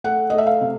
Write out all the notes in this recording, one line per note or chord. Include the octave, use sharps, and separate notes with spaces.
A3 F#5
A3 D#5
E5
F5
C3